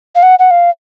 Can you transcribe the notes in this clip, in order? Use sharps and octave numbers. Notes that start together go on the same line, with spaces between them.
F5
F#5
F#5
F5